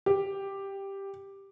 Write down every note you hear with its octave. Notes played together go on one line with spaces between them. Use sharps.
G4